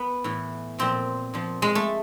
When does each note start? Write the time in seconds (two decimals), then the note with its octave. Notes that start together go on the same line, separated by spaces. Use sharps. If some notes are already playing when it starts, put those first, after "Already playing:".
Already playing: B3
0.24 A2 E3
0.79 A#2 F3 C4
1.34 A#2 F3
1.62 G#3
1.75 A3